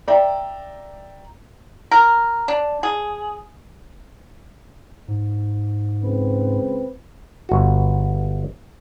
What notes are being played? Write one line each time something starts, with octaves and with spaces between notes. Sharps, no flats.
D5 E5 G5 A#5
A#4
D4
G#4
G#2
C#2 C4 B4
G1 F#4